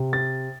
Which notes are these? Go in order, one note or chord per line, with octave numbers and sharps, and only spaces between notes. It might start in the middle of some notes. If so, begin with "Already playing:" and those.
Already playing: C3
A6